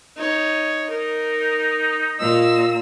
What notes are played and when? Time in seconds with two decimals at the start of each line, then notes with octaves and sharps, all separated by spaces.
0.16 D#4 C#5
0.90 D#4 A#4
2.20 A#2 A#3 D#5 F5 E6